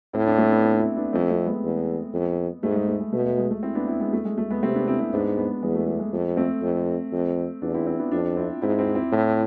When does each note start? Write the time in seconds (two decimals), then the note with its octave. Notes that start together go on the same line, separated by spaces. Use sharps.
0.13 A2 C4 E4
0.27 D4
0.38 A3 C4
0.51 B3 D4
0.63 C4 E4
0.74 D4
0.80 C4 E4
0.97 B3 D4
1.13 F2 A3 C4
1.30 A3 C4
1.46 G#3 B3
1.64 E2
2.14 F2
2.63 G#2 A3
2.76 G#3
2.88 A3
3.00 G#3
3.13 B2 A3
3.25 A3
3.38 G#3
3.51 A3
3.63 C4 E4
3.75 B3 D4
3.87 C4 E4
4.00 G#3 B3
4.13 A3
4.25 G#3
4.38 A3
4.50 G#3 B3
4.63 C3 A3 C4
4.75 B3 D4
4.88 C4 E4
5.00 C4 E4
5.13 G#2 B3 D4
5.37 G#3 B3
5.63 E2 G#3
5.75 A3
5.87 A3
6.00 G#3
6.13 F2
6.37 A3 C4
6.62 F2
7.12 F2
7.62 E2 D4 F4
7.74 C4 E4
7.87 C4 E4
7.99 B3 D4
8.11 F2 D4 F4
8.37 C4 E4
8.62 G#2 C4 E4
8.79 C4 E4
8.95 C4 E4
9.12 A2